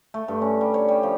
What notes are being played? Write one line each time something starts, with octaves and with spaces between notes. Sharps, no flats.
A3
G2
C#4
G3
C#5
G3
F3